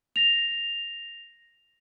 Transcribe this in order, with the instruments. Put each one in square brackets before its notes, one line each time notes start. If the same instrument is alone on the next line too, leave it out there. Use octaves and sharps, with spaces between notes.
[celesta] A#6 F7